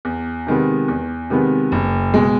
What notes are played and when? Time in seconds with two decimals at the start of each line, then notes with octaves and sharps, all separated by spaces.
0.05 E2
0.47 C3 D#3 G#3 B3
0.88 E2
1.30 C3 D#3 G#3 B3
1.72 F#1
2.14 B2 G#3